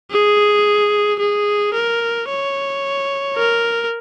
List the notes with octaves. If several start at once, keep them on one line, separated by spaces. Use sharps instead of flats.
G#4
G#4
A#4
C#5
A#4